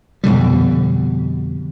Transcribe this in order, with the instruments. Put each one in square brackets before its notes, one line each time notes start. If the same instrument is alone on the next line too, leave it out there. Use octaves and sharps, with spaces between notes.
[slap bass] F2 B2 D3 G3